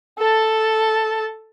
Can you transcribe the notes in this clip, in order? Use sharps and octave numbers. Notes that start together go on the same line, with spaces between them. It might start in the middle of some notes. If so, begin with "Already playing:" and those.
A4 A5